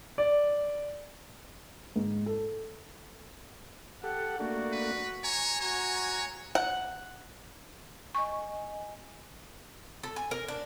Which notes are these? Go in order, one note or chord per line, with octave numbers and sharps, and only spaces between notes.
D5
G#2
A4
G4 A4 F#5
A3 A#3 D4 F#4
B4
C#5 G#5 A#5
F#4 C#5
F#5
D#5 G#5 C#6
A4
G#5
A#4
D4